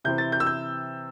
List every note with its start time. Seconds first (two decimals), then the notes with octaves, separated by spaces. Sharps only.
0.05 C3 E3 C4 E4 G6
0.18 A6
0.32 G6
0.40 E6
0.46 G6